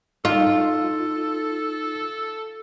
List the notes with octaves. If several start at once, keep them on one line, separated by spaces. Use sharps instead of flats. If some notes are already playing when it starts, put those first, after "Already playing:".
D#4 F4 A4